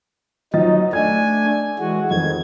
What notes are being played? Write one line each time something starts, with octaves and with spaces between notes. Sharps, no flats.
F3 F#3 D#4 D#5 A6
A3 D4 G#5 G#6
E3 G#3 F#4
F2 D#3 G#6